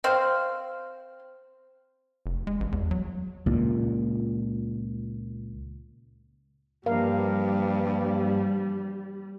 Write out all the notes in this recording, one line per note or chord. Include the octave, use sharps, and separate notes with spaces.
C4 C5 F5
F1
G#3
A1
E2
F#3
C#2 A#2
G2 E3 F3 G3 A#3 A#4 F5